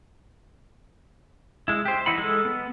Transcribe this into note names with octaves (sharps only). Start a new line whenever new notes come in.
G#3 E4
G4 C5
E3 D#4 E4 F#5 B5
G#3 A4
B3